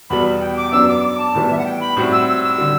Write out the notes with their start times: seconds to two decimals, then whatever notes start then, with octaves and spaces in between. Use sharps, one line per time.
0.10 E2 B2 G3 B5
0.41 G5
0.57 D6
0.72 F#2 F#3 B3 D4 E6
0.88 D6
1.04 D6
1.18 A5
1.35 A2 E3 G3 B3
1.51 E5
1.58 F#5
1.65 G5
1.81 B5
1.97 A2 G3 C4 F#4
2.12 E6
2.28 E6
2.44 E6
2.58 D3 G3